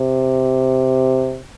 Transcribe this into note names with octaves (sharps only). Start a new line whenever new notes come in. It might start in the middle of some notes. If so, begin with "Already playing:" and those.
Already playing: C3